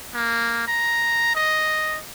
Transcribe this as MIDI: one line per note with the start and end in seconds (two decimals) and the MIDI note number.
0.14 0.66 58
0.68 1.34 82
1.35 1.99 75